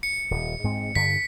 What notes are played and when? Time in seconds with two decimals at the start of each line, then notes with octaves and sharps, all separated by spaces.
0.03 C#7
0.31 D#1
0.64 G#2 G#3 C4
0.95 G2 D3 B6